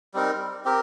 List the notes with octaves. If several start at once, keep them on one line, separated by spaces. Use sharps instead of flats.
G3 C4 D#4 A#4
C4 G4 A#4